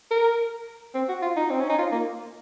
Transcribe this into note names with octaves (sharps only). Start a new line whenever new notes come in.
A#4
C4
F#4
F4
D#4
C4
C#4
D#4
F4
A#3